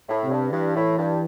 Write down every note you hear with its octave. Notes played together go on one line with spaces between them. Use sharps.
A2
C3
G2
G2 E3
A2
G2